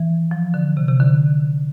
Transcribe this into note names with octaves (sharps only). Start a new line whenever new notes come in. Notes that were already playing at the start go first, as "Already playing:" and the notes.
Already playing: E3
F3
D3
C3
C3
D3